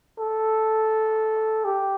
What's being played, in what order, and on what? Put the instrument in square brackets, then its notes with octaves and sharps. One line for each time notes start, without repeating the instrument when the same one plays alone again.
[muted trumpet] A4
G4